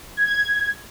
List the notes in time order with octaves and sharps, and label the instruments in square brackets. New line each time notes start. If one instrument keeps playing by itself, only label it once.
[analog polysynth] G#6